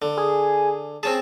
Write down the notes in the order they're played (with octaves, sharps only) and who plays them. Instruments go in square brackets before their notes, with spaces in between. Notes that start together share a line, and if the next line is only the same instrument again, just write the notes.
[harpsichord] D3
[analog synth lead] G#4
[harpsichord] C4 C#4 G#4 [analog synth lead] A5